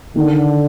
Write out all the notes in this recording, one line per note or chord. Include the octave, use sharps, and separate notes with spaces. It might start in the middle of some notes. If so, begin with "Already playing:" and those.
D3 D#3